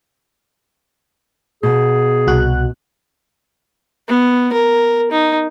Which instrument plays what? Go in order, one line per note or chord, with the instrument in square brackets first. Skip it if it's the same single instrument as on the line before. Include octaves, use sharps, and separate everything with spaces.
[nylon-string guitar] B2 [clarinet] G#4
[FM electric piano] C2 F#4 F#6
[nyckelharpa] B3
A#4
D#4